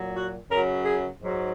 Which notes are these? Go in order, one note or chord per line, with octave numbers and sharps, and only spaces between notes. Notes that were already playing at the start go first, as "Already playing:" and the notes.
Already playing: A#2 F#3
F#4
F#2 C#3 F#3 A#4
G#4
G#2 F#3